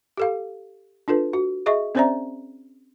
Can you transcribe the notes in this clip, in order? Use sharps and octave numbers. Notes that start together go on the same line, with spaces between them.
G4 A4 F5
D4 F4 A4 B4
F#4
G#4 D#5 E5 C#6
C4 C#4 C5 D5 E5 A#5